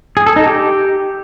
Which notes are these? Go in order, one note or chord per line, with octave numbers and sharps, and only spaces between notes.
G#4
A4
D#4
G4